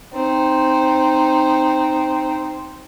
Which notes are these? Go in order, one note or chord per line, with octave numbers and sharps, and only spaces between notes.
C4 D#4